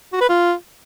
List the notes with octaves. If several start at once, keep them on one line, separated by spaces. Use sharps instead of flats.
F#4
B4
F4